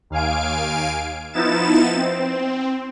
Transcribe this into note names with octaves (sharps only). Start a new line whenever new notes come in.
D#2 F5 G#5 D7
F3 B3 D#4 E4 A6 E7
C4